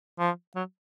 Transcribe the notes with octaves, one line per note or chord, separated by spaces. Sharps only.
F3
F#3